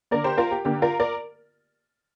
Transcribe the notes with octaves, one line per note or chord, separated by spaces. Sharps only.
D3 A#3 A#4 D5
G4 C5
F4 A#4
G4
D3 A#3 G4
F4 A#4
A#4 D5